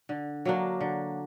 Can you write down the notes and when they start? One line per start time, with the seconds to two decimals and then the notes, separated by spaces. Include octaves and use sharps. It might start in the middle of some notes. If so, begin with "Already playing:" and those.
0.09 D3
0.45 F#3 A#3 D4
0.81 D3